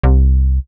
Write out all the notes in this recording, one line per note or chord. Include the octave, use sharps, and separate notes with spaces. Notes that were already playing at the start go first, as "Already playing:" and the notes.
C2